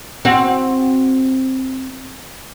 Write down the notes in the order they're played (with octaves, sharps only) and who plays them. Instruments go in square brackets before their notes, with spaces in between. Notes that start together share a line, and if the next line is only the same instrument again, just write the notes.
[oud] C4 F#4